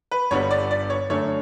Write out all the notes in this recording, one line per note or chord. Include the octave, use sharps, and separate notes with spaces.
B4
G1 G2 D3 G3 B3 C#5
D5
D5
C#5
F#2 D3 A3 C#5